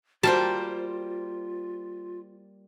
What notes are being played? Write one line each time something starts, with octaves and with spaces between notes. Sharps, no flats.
G3 A#3 F4 F#4 C5 A5